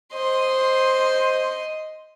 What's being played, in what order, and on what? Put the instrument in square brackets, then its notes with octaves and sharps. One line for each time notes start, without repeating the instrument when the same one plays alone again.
[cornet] C5 [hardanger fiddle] D#5 C6